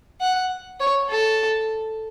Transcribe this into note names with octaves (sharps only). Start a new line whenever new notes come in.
F#5
C#5
A4